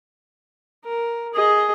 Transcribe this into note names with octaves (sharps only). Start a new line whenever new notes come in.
A#4
G#4 D#5